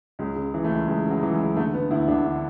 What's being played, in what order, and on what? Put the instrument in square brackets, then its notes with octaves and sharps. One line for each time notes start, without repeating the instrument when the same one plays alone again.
[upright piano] C#2 G#3
C#3
E3
A3
C#2
C#2 G#3
C#3
F#3
E3
G#3
C#2
D3 A3
D3 B3
D2 E4
D2 D4
D3